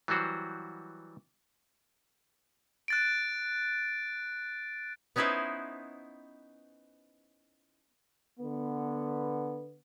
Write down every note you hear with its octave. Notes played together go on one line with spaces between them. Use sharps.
E3 F#3 G3 F#4 C5
F#6 A6 D7
B3 C#4 D#4 E4 B4 C5
D3 B3